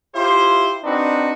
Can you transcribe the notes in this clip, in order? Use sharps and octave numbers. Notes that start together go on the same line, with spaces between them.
E4 F4 G4 C5
C4 D4 D#4 F#4 B4